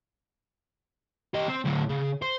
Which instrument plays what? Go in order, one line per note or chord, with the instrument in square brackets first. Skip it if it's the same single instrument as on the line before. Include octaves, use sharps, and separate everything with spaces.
[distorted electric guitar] G4 D#5
C4
D2 A2
C#3
C5